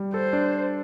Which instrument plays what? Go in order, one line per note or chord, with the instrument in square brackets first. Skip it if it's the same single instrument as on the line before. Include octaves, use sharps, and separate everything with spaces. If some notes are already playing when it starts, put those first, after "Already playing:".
Already playing: [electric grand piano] G3
[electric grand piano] A4 [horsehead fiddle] C5
[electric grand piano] D4